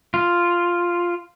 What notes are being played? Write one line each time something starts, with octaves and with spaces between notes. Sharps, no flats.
F4